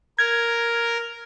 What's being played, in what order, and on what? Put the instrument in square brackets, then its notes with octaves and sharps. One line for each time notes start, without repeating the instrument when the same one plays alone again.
[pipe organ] A#4 [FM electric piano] G#6